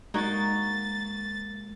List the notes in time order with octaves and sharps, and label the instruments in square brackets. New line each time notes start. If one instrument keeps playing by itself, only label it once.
[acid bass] G#3 [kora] A#3 D#4 F#4 [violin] A6